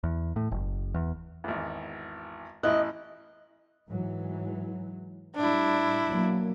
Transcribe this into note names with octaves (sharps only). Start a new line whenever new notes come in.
E2
A2
F#1
E2
G#1 E2
A1 E4 D#5 F#6
G#2 E3 F#3
A2 G3 D4 E4
B2 F#3 A#3